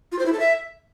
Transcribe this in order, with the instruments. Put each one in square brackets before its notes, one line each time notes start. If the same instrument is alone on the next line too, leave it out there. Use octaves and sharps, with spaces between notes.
[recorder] F4
C5
E4
A4
E5